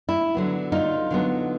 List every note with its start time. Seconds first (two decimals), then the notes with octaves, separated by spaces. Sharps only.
0.09 E4
0.35 D3 F#3 B3
0.72 D#4 F4
1.11 D3 F#3 B3